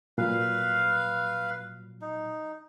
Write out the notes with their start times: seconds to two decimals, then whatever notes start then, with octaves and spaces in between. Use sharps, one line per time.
0.18 A#2 F#3 B4 F5
2.01 D#4